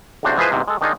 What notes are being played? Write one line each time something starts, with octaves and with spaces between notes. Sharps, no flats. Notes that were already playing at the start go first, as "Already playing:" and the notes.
B1 E2 C3 D4 F#4 C5
E3 F3 G#3 G#4 B4 C5
E2 G#2 C3
G#3 A4
D#3 D4 D#4 F4 G#4 D#5